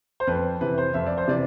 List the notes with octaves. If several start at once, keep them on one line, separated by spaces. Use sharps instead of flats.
C5
F2 B4
C3 E3 B4
C5
F2 E5
D5
C5
C3 E3 D5